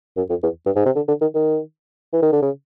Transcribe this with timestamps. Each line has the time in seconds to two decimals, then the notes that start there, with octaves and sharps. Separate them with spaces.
0.17 F#2
0.30 F2
0.43 E2
0.66 G2
0.76 G#2
0.86 C3
0.96 D3
1.08 D3
1.21 D#3
1.35 D#3
2.13 E3
2.22 D#3
2.32 D3
2.42 C#3